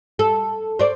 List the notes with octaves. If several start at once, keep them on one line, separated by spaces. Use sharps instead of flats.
A4
C5 D5